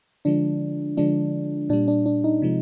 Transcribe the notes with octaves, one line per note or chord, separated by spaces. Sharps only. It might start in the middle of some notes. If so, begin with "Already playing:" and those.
D3 F3 G#3 D4
D3 F3 G#3 D4
A#2 G3 D4
D4
D4
D#4
C3 F3 G#3